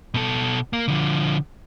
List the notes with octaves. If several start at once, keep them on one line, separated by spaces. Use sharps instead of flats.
B2 A4
A#3
D3 F3